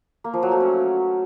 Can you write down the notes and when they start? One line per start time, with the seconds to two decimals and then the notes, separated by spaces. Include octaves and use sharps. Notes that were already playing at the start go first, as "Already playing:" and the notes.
0.24 A#3
0.33 F3
0.43 F#3
0.52 A3
0.61 C#4